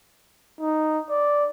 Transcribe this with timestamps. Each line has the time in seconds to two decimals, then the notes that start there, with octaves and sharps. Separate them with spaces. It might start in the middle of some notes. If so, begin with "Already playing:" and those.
0.61 D#4
1.10 D5